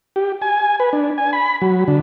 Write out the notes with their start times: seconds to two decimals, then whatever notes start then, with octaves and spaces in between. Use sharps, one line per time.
0.16 G4
0.42 G#5
0.80 B4
0.93 D4
1.18 G#5
1.33 B5
1.62 F#3
1.88 D3